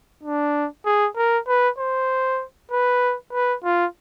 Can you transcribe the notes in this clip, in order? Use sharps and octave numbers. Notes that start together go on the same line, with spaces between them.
D4
G#4
A#4
B4
C5
B4
B4
F4